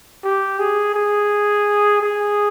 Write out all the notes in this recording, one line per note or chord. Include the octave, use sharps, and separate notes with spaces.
G4
G#4
G#4
G#4